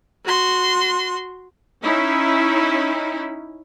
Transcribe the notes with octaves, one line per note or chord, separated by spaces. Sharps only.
F#4 C6
C#4 D#4 E4